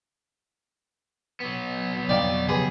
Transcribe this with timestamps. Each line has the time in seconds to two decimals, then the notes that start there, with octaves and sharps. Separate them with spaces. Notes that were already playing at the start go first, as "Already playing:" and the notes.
1.40 F#3 B3
2.09 F2 D3 G3 D#4 D5 F5 G5
2.48 C#3 F3 G4 G#4 B4 B5